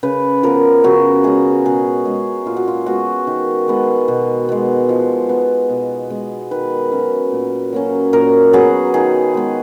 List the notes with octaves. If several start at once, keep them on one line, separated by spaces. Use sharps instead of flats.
C#3 B4
F3 B3 A#4
C#3 F#4
G#3 C#4 G#4
B2 G#4
G#3 C#4
A#2 F4
F#4
F4
G#3 B3 F#4
D#3
G#3 B3
B2
G#3 B3
F3
B3
B2
G#3 B3
D#3 B4
F#3 C#4
A#2
F#3 A#3 C#4
A#2 A#4
F#3 B3 G#4
D#3 G#4
G#3 B3